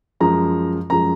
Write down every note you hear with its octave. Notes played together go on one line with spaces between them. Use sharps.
F#2 F3 G#3 A#5
F#2 F3 G#3 A#5